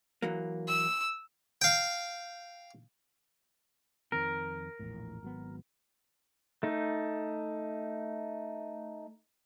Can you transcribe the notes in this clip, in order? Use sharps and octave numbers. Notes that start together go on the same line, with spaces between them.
E3 F#3 A#3
E6
F5 G5
F2 D#3 C4 A#4
A#1 E2 A2
G#1 F#3 B3
A3 D#4